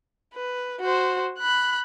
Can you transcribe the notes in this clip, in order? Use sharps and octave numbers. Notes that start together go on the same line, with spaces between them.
B4
F#4 C5
B5 F#6